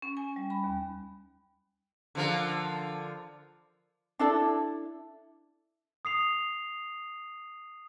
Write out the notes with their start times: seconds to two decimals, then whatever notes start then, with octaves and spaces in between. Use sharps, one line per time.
0.02 C#4
0.17 G#5
0.36 G3
0.50 B5
0.64 D#2
2.15 D3 F3 A#4
4.19 D4 E4 A4 D5
6.05 D#6 C7 F7